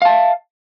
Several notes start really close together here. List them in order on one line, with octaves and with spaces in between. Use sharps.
F5 A5 E5